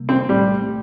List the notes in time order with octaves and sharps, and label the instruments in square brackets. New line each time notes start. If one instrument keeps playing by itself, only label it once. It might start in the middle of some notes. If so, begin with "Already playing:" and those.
Already playing: [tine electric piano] C3 G3 A#3
[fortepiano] C4
[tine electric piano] A#1 A2 A3 [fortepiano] G3